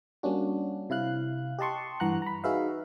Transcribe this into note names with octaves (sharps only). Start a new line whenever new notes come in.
G3 A#3 C#4 D4 F#4
C3 E4 F5 F#6
G4 D#5 A5 C6 C#6
G2 E3 F#5 A#5 F#6
A#5 B5
D#4 F#4 G#4 B4 E5 F5